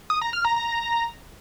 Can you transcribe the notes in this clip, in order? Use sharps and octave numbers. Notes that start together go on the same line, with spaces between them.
D#6
A#5
F6
A#5
A#5